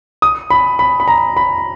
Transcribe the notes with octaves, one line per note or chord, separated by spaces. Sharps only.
D#6
B5
B5
B5
A#5
B5